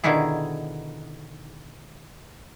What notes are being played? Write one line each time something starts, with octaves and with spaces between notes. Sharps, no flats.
B2 D3 D#3 D#4 E4 G#4